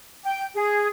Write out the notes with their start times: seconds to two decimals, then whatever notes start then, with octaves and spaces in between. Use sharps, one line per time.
0.24 G5
0.54 G#4